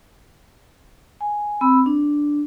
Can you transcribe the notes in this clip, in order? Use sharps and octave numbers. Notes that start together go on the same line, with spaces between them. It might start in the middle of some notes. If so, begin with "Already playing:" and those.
G#5
C4 B5 E6
D4